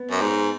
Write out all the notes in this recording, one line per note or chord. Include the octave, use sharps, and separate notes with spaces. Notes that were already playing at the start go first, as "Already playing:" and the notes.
Already playing: B3
F#2
G#2